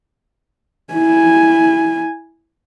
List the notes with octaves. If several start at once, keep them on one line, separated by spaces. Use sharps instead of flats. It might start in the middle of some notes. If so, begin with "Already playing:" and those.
E4 G#5